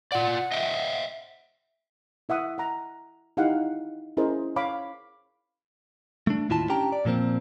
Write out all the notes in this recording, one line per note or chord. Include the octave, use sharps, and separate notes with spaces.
F4 D5 F#5
D#5 E5 G5
E4 E5 F#5 D#6
F#5 A#5
D#4 E4 G4 F5 F#5
C#4 E4 G#4 A#4 C5 D#5
C#5 F5 B5 D6
A3 D4
D#2 A2 E4 F4 A5
C#4 D4 G4 G5 A5 A#5
D5
A#2 F3 A#3 C4